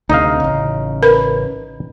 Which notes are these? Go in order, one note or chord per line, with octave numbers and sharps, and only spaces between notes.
D2 C3 D#4 D#5 F5
A1 C#3
A#4 B4 B5